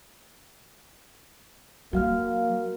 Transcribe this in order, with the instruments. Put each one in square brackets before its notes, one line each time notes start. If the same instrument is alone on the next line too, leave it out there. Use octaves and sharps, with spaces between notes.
[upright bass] F#3 [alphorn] A#3 [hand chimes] F#4 F5 F6